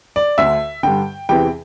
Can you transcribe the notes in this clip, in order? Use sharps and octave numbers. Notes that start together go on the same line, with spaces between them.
D5
D2 D3 E5
G2 D3 G5
E2 C3 E3 G5